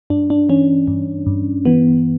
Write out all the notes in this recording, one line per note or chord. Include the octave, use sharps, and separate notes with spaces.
G2 D4
D4
E3 C#4
G2
G2
E3 B3